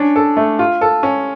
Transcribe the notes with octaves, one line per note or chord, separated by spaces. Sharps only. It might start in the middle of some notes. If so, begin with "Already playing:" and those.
Already playing: C#4 D4
A4
A3
F4
A4
C#4